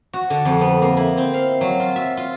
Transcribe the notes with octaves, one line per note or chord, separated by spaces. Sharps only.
F#4
D3
F2
B3
A#3
E4
C4
F5
F#3
F4
E5
F4